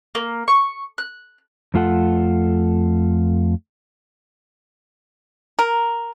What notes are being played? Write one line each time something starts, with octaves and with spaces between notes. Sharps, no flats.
A#3
C#6
F#6
F2 A3 F4 A4 F#5
A#4